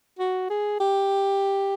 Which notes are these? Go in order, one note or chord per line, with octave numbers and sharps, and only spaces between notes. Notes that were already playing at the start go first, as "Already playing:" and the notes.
F#4
G#4
G4